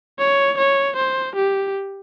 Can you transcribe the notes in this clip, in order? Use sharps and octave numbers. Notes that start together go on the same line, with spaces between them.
C#5
C#5
C5
G4